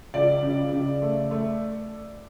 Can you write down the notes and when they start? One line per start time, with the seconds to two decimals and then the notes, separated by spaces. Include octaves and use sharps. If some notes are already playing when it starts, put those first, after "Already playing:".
0.14 C#2 D5
0.43 C#3
0.72 C#3
1.02 A3
1.31 A3